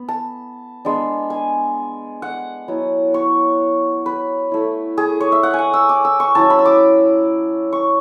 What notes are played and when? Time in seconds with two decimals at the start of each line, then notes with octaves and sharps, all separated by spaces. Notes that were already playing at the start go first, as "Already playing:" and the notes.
Already playing: B3 B5
0.08 A5
0.85 G#3 B3 D4
1.30 G#5
2.22 F#5
2.68 F#3 B3 E4
3.14 C#5
4.06 B4
4.52 A3 E4
4.98 G#4
5.20 C#5
5.32 E5
5.43 F#5
5.54 F#5 G#5
5.73 E6
5.89 D6
6.05 E6
6.20 C#6
6.35 F#3 C#4 E4 A5
6.50 B5
6.59 E6
6.66 D6
7.73 C#6